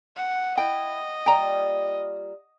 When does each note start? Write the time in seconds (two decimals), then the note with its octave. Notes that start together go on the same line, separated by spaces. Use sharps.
0.16 F#5
0.58 E4 D#5 G5
1.26 G3 A#3 F4 G5 A#5